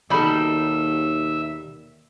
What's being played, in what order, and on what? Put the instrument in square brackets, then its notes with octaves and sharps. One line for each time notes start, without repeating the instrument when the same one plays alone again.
[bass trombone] D#2 [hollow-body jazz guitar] B2 D#3 B5 [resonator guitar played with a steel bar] G3 A4 [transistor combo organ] E5